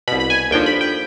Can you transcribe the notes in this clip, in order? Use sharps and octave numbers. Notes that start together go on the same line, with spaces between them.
C2 B2 B5
B5
G#5
D#2 D3 F3 G5
B5
G5